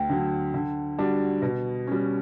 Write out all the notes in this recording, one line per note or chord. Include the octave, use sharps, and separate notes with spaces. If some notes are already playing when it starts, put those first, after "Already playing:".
Already playing: D2 G5
D3 F#3
D3
G3 D4 F#4
B2
G3 C#4